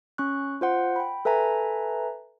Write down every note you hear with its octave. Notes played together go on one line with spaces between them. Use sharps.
C#4 C#6 F#6
F4 C5 F#5 C6
G5 B5
A4 B4 E5 G#5 A#5